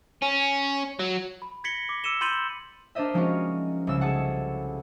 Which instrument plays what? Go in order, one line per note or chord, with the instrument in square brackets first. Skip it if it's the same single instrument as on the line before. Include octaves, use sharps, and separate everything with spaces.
[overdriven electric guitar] C#4
F#3
[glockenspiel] B5
G#6 A#6 B6 C#7 F#7 G7
D6
D6 E6 C#7 D#7 E7 G7
B5 C6 G6 A6 D#7 F#7
[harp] D4 A#4 C5 D#5 E5
F3 G#3 A#3 C#4 D#4 F#4
C2 C#3 G#3 E6
G#4 A4 F#5